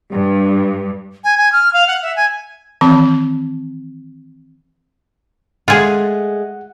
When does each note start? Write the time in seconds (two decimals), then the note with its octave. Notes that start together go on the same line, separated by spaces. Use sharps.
0.11 G2 G3
1.24 G#5
1.37 G#5
1.52 F6
1.73 F5
1.88 F#5
2.02 E5
2.16 G#5
2.81 D#3 E3 C4 A5
5.68 G#3 A3 F4 G#4 F#5